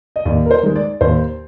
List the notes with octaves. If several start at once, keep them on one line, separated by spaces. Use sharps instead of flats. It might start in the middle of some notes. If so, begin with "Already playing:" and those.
D#5
D#2 D5
A#4
C5
D#3 G#3
D5
D#2 C5